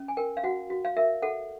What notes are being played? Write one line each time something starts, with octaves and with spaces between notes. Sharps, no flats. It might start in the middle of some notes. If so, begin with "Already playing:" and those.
Already playing: C#4
G#5
A#4 G5
F5
F#4 F#5
F#4
F5
A#4 E5
A4 F#5